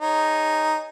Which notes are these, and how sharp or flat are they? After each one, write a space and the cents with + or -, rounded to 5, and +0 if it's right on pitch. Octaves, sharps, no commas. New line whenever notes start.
D#4 +0 G#4 -25 C#5 +0